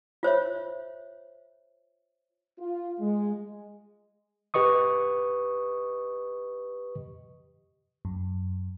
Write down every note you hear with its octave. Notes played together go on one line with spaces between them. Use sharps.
F4 C5 C#5 E5
F4
G#3
G4 B4 D#5 C#6 D#6
F#2